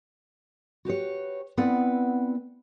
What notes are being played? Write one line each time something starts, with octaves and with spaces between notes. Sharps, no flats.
F#4 G4 B4 C#5
B3 C4 E4 B4 D5 F#5